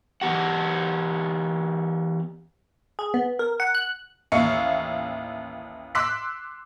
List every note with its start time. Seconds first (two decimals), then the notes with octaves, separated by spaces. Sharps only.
0.22 E3 B3 G4 F#5
2.99 G#4
3.14 B3
3.39 A#4
3.60 F#5
3.75 F#6
4.32 A1 D#2 E5 F5 C#6 C#7
5.95 C6 D6 E6 F#6 B6